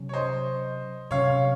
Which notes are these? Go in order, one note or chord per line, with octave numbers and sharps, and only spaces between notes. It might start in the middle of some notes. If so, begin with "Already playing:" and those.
Already playing: C3 F#3 C#4
C#5
C5 D#5
C3 F#3 C#4 C#5 F5